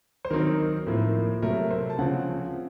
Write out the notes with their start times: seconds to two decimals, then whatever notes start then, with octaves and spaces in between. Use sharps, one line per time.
0.25 C5
0.30 D#3 F#3 C4 D#4 A#4
0.86 A2 F3 A#3
1.42 C3 F#3 A3 A#4
1.71 C5
1.90 A5
1.99 C#3 F3 C4 F#5